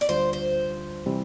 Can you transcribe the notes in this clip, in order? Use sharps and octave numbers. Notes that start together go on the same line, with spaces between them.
D5
D2 D3 G3 D4 F4 C5
C5
C3 E3 G3 C4